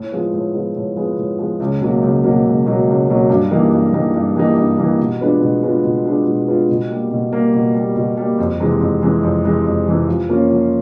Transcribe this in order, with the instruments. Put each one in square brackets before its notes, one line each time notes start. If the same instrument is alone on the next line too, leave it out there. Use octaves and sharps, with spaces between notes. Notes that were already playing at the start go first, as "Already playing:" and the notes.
Already playing: [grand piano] A2
F3 G#3 B3
A2
F3 G#3 B3
A2
F3 G#3 B3
A2
F3 G#3 B3
C#2
B2 F#3 A#3
C#2
B2 F#3 A#3
C#2
B2 F#3 A#3
C#2
B2 F#3 A#3
G2
E3 G3 A#3 D#4
G2
E3 G3 A#3 D#4
G2
E3 G3 A#3 D#4
G2
E3 G3 A#3 D#4
B2
G#3 B3 D4 F4
B2
G#3 B3 D4 F4
B2
G#3 B3 D4 F4
B2
G#3 B3 D4 F4
B2
G3 A#3
B2
G3 A#3
B2
G3 A#3
B2
G3 A#3
F2
C3 E3 G#3
F2
C3 E3 G#3
F2
C3 E3 G#3
F2
C3 E3 G#3
F3
A#3 C#4 F4
F3